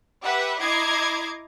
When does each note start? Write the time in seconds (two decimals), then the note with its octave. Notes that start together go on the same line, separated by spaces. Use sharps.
0.23 G4 B4 E5 F#5
0.61 E4 D#5 A#5 D6 G#6 C7